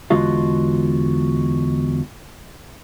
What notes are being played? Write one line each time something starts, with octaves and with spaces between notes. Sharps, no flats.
E2 D3 G#3 F4 F#4 F5